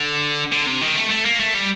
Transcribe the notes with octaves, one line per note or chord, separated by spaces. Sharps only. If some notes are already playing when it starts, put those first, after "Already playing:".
Already playing: D3
D3
C3
D#3
A3
A3
A#3
A3
G3